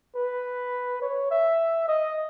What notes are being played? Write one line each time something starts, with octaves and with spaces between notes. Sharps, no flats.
B4
C#5
E5
D#5